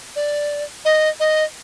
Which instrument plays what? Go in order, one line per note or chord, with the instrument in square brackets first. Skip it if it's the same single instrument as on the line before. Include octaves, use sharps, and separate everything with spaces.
[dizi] D5
D#5
D#5